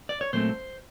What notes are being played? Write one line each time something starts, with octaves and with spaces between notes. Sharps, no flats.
D5
C#5
A#2 F#3 A3 C4 C5